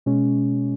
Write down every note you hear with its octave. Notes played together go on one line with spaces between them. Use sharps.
B2 G#3 C#4